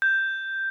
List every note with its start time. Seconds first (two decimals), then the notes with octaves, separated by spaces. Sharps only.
0.02 G6